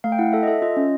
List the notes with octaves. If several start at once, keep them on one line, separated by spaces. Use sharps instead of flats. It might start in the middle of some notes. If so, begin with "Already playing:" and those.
A3 F5
G5
E4 F#5
A4 E5
D#5
A4 E5
F4 D#5
C#4